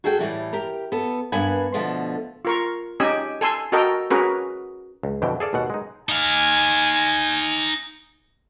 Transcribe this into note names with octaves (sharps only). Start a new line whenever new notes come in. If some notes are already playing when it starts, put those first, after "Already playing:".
F#4 G#4 A4 F#5 G5
A2 E3 G3
G4 A#4
B3 A4
G2 A#3 B3 B4 F#5 G#5
B2 D3 F3 A3
F4 A#4 C#6
C#4 D#4 G4 D#5 G#5 E6
A4 G#5 C6 E6
F#4 A4 A#4 D#5 G5
C#4 F#4 G#4 A#4 B4
C#2
F2 B2 D3 E3 G5
G#4 A4 D5 F5
D#2 B2 F#5
G#3 D#4
D#4 F5 G#5